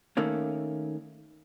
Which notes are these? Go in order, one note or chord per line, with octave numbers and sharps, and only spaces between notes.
D#3 A3 A#3 C#4